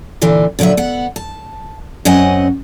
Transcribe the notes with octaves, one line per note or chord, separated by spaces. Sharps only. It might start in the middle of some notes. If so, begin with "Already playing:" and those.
A#2 D3 E3 D4
A#2 D3 F#3 B4 E5
B3 F#5
A5
F#2 C4 C#4 D#5 F#5 G#5